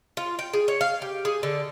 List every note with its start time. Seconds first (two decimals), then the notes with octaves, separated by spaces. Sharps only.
0.17 F4
0.39 G5
0.53 G#4
0.68 C#5
0.81 F5
1.02 G4
1.25 G#4
1.43 D3